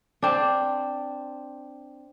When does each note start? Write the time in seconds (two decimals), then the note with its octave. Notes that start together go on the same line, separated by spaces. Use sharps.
0.23 C4 D4